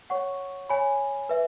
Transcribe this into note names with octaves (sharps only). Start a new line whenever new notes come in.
C#5 F#5 C#6
C#5 G#5 B5
B4 E5